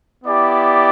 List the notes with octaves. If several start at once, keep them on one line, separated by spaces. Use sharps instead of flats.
B3 E4 G4 D5